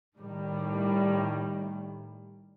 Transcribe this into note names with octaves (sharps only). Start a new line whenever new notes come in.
A2 D#3 G3